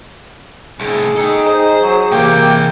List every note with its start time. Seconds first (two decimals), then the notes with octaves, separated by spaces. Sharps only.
0.80 C2 A2 G#4
1.16 D#4 A4 G5
1.47 D#4 C5
1.82 F#3
2.11 C3 E3 A#3 G4 G5